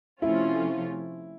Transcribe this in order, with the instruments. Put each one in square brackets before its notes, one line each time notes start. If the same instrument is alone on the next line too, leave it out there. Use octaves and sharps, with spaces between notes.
[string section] C3 F3 A3 C#4 F4 [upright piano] E4